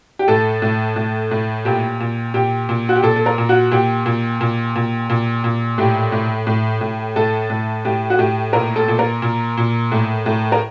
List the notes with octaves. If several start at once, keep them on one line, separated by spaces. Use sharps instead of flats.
G4
A2 A4
A2
A2
A2
A#2 G4
A#2
A#2 G4
A#2
F#4
G4
A#2 A4
A4
A#4
A#2
F#4
A#2 G4
A#2
A#2
A#2
A#2
A#2
A2 G4
A2
A2
A2
A2 A4
A2
A2 G4
F#4
A2 G4
A#2 A#4
A4
A#2
A#4
A#2
A#2
A2
A2
A#4